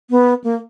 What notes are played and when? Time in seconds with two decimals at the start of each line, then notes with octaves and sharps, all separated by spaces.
0.10 B3
0.44 A#3